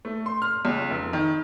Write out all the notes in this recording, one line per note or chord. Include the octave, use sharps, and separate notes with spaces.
A3
C6
F6
C#2
F1
D#3